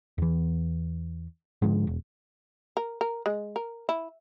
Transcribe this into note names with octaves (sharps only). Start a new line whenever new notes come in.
E2 E3
G#2 D3 F3 G#3
E1
A#4
A#4
G#3
A#4
E4